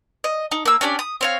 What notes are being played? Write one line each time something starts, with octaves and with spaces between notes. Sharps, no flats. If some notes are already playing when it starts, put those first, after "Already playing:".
D#5
D#4
A#3 E6
C#4 D4 G4 D5
D#6
C4 C#5 F5